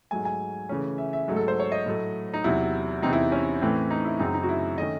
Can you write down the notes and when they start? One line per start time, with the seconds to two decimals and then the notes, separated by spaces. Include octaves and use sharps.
0.11 G#2 F#3 A3 G#5
0.25 G#5
0.69 C#3 E3 A3 C#4
0.98 E5
1.13 E5
1.28 G#2 F#3 A3
1.36 A4
1.48 C5
1.60 C#5
1.72 D#5
1.86 A2 F#3 A3
2.34 D#4
2.44 E2 C3 F#3 E4
3.02 E2 C3 E3 C4 D#4
3.13 E4
3.32 C#4
3.61 A2 E3 A3 C4
3.91 D#4
4.05 E4
4.19 F#2 C#3 F#3 C4 D#4
4.34 D#4
4.43 F#4
4.49 E4
4.78 D#3 A3 C#4 D#5